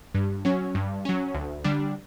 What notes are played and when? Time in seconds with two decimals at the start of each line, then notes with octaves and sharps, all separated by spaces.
0.14 G2
0.45 F#3 C#4
0.75 G2
1.05 F#3 C#4
1.34 D2
1.64 D3 G3 D4